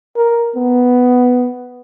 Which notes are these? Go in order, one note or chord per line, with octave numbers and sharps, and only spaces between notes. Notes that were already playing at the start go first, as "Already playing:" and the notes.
A#4
B3